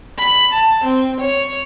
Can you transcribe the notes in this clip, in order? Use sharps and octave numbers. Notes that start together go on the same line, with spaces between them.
B5
A5
C4
C#5